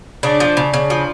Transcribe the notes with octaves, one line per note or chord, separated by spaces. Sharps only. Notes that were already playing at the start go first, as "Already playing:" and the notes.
C#3 D4
F3
C#3
C#3
F3